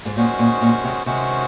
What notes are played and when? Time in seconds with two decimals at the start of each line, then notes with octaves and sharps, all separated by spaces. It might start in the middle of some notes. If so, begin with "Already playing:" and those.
0.05 G#2
0.16 A#2 D#3 G#3 C#4 F#4 C5
0.39 A#2
0.61 A#2
0.84 C3
1.06 C3 D#3 G#3 C#4 F#4 C5